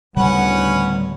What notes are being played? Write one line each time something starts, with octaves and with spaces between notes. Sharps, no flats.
D2 A2 C#3 G3 C#4 B4 F#5